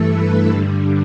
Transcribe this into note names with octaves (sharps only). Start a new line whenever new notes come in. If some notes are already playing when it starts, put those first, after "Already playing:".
Already playing: G2 E3 A3 A4
B4
G2 D3 G3